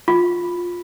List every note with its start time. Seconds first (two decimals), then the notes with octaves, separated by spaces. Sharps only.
0.08 F4